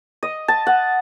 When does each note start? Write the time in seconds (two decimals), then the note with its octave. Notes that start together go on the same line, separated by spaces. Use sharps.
0.23 D#5
0.48 A5
0.67 F#5